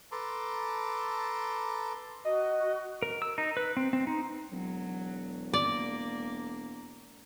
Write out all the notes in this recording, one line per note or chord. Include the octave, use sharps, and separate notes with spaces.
A4 B4 A5 A#5 C6 D6
F#4 D#5
A#4
E6
D#4
B4
C4
C4
D#4
E1 F#3
A#3 D5